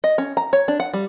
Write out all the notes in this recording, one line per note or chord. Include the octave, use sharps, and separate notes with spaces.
D#5
C#4
A#5
C#5
D4
F#5
G3